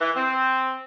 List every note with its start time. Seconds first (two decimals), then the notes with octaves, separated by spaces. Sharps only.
0.01 E3
0.16 C4